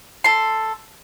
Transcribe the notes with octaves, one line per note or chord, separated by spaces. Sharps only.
A4 C6